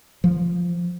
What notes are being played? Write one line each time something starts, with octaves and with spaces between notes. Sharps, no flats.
F3